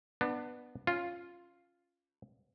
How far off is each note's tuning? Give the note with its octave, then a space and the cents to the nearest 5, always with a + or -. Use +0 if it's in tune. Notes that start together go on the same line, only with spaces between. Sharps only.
B3 +0 D4 +25
C#4 +0 F4 +0